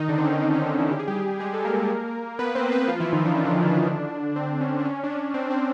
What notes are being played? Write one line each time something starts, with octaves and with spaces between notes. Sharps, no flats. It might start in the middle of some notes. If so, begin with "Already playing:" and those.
Already playing: D#3 D#4
D3 D4
C4
C#4
C4
C#4
D#3 D#4
E3 E4
G4
G#4
G3 G4
G#3 G#4
A4
A#3 A#4
B3 B4
C4 C5
B3 B4
F3 F4
E3 E4
D#3 D#4
D4
C#4
D3 D4
C4
C#4
D4
C#4
D4
C#4
C4
C4